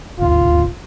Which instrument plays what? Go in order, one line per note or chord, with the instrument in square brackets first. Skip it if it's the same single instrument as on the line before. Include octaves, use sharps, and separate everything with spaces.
[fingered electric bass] D#1 G#1 D2 [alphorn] F4